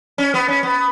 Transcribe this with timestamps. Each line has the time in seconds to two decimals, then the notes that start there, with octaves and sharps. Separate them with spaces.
0.18 C#4
0.34 B3
0.48 C#4
0.63 B3